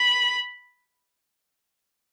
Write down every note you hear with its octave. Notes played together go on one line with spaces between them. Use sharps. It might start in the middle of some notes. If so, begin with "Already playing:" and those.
Already playing: B5